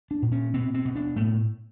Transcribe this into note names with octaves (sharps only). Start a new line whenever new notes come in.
D4
A#2
C#4
B2 C4
C4
B2
D4
A2 A3